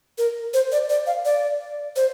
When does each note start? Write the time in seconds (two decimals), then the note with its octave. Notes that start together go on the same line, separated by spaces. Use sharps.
0.18 A#4
0.54 C5
0.72 D5
0.90 D5
1.07 F5
1.25 D5
1.96 C5